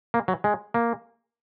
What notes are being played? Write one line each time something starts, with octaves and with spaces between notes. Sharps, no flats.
A#3
F#3
G#3
A#3